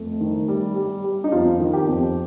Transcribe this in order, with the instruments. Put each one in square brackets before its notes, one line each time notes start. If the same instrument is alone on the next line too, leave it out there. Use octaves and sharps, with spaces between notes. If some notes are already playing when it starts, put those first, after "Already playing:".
Already playing: [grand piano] F2 A3
D#3
G3
G3
G3
D#4
F2 F4
D#3
G4
F2